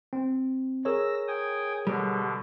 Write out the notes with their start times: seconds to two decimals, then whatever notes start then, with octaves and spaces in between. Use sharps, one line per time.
0.13 C4
0.85 G#4 A#4 C#5 E6 A#6
1.28 G5 G#5 D#6
1.87 B2 D3 G3